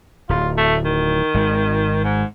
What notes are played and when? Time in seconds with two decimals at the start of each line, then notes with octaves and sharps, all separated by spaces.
0.29 D1 F4
0.57 A3
0.85 D#3
1.34 G#1 G#3
2.04 G#2